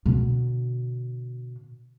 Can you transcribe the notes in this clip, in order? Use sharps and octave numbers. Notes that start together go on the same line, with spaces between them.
B2 D3